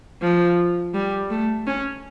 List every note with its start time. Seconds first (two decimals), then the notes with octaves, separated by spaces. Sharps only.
0.22 F3
0.94 G3
1.30 A3
1.67 C#4